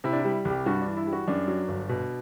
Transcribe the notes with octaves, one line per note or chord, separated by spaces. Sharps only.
C3 E4
D4
G3 E4
C2
G4
G2 F#4
D4
E3
E4
G3
F#4
F#2 D4
F#3
G1
B2